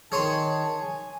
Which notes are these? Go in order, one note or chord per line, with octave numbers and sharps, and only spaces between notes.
D#3 G#4 C#5 A5 C6
G#5